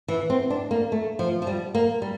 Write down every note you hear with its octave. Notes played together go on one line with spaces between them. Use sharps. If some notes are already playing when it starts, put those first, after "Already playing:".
E3
C4
D4
A#3
A3
F3
F3
G3
A#3
G3